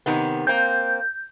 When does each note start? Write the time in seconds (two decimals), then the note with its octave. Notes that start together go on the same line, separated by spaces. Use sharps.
0.06 C3 D#3 B3
0.47 A#3 C4 G6